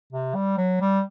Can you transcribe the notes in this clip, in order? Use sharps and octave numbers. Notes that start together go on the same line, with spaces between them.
C3
G3
F#3
G3